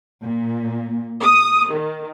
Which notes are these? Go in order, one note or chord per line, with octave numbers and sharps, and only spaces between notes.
A#2
D#6
D#3